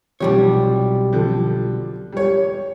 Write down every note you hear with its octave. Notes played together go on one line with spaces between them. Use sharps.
B1 C3 F3 G3 C#5
D3 F3
G3 C#5